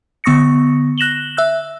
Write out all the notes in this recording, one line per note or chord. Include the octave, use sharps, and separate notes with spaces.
D3 B3 C#6 D#6 A#6 C#7
F#6 A#6 E7 F#7 G7
E5 E6 F#6